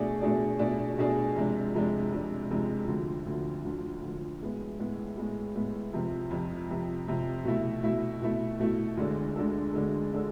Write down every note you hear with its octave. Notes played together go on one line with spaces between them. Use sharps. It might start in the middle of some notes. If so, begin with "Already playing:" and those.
Already playing: B2 A3 D4 G#4 D5
B2 A3 D4 G#4 D5
B2 A3 D4 G#4 D5
B2 A3 D4 G#4 D5
F2 C3 G#3 D4
F2 C3 G#3 D4
F2 C3 G#3 D4
F2 C3 G#3 D4
D2 D3 F3
D2 D3 F3
D2 D3 F3
D2 D3 F3
A2 G#3 B3
A2 G#3 B3
A2 G#3 B3
A2 G#3 B3
F2 C3 F3
F2 C3 F3
F2 C3 F3
F2 C3 F3
B2 A3 E4
B2 A3 E4
B2 A3 E4
B2 A3 E4
D2 D3 G#3 D4 A4
D2 D3 G#3 D4 A4
D2 D3 G#3 D4 A4
D3 G#3 D4 A4